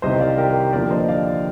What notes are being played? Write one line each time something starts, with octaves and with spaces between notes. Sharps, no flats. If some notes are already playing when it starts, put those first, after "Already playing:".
C2 C3 D#3 C5 D#5
D5 F5
G4 A#4
D#2 D3 F3 A#4 D5
C5 D#5
D5 F5